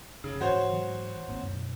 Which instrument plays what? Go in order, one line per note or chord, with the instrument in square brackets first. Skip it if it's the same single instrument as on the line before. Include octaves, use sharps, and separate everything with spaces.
[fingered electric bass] F1 [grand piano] C#3
[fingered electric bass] G#2 E3 F3 [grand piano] F#4 C5 C#5
[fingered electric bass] G#2 E3 F#3
G#1 A#3 C4
F#2 B2